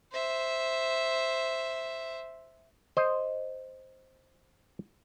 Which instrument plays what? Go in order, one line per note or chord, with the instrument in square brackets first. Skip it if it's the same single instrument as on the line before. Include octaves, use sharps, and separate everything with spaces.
[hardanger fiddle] C5 E5
[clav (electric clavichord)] C5 D#5